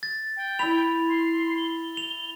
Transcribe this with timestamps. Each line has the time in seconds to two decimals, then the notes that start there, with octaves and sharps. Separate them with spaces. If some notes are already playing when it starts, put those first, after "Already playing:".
0.03 A6
0.37 G5
0.59 E4 B5 F7
1.08 C6
1.57 G7
1.97 F7